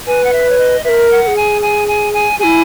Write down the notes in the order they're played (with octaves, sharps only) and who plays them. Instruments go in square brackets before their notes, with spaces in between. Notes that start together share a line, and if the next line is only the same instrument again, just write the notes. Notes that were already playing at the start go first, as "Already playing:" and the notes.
[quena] B4 [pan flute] G#5
[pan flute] F#5
E5
C#5
D#5
[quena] B4 [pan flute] E5
[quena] A#4
[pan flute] F#5
[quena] A#4
G#4
[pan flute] G#5
G#5
G#5
G#5
[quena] E4 G#4 [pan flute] G#5